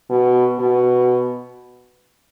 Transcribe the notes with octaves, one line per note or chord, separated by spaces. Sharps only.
B2
B2